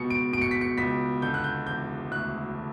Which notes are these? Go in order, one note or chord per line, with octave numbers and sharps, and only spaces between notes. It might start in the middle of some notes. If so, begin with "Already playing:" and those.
Already playing: C#2 B2 C#7
D7
B2 D7
C#7
B6
C#7
C#2 B6
D3 G6
F#6
G6
E1 G6
D2 F#6
D3